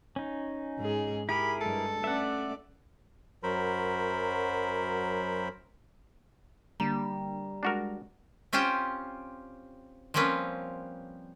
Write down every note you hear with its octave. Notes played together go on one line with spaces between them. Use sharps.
C#4 D#4
G#2 G#4
E4 G4 G#4 A#4 B5
G2 G#3 A4
A3 C#4 D5 E5 F#5
F#2 F#3 A#4 C5 B5
D3 G3 A#3 D4 A#5
G#3 D4 F#4 A#4
C4 C#4 F4 G4 C5 G5
F3 G3 A#3 C4 C#4 B4